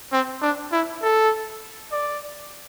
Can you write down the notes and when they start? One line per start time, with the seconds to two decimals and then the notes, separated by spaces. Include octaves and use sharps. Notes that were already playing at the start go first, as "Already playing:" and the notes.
0.12 C4
0.42 D4
0.72 E4
1.03 A4
1.92 D5